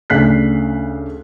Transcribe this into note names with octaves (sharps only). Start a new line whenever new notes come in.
D2 C#3 D4 F#6 B6 C7